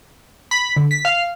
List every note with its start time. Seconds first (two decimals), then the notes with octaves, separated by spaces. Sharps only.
0.51 B5
0.76 D3
0.91 B6
1.05 F5